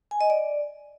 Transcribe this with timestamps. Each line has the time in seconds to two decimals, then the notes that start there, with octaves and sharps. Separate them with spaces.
0.11 G#5
0.21 D#5
0.30 D5